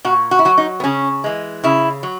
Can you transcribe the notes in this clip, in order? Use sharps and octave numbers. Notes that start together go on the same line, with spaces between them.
A#2 F#4
F#4
E4
F#3 F#4
D#4
B3
C#3 C#4
E3 G#3
C#3 E4
F#3